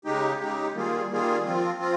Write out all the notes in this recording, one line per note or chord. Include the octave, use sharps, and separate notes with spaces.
C#3 G#3 D#4 G4
C#3 G#3 D#4 G4
D#3 G3 A#3 F4 G#4
D#3 G3 A#3 F4 G#4
F3 C4 F4
F3 C4 F4